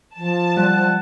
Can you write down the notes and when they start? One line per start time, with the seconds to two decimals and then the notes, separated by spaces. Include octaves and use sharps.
0.17 F3 A5
0.57 G3 F#5